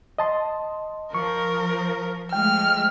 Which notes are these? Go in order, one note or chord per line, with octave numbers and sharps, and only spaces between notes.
D#5 A5 C6
F3 A#4 C#6
F3 G#3 A3 G5 F6